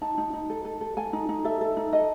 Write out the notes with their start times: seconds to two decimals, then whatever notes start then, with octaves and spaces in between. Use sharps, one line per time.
0.01 D#4 A5
0.18 D#4
0.33 D#4
0.50 A4
0.65 A4
0.81 A4
0.97 A4 G#5
1.13 D#4
1.29 D#4
1.44 A4 E5
1.61 A4
1.77 D#4
1.93 A4 D#5